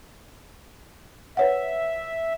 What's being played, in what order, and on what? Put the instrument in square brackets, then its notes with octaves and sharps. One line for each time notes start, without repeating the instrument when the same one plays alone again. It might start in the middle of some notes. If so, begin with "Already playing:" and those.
[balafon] B4 C#5 F#5 [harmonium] E5